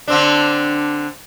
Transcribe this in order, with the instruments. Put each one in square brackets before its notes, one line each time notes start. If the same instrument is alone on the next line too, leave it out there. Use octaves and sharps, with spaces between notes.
[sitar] D3 C4 D4